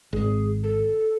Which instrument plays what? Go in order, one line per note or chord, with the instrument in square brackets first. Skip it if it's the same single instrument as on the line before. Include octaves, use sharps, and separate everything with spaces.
[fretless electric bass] G#1 [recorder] G#4
[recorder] A4